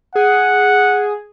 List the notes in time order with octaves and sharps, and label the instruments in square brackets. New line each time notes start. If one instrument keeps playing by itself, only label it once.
[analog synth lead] G#4 [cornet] F#5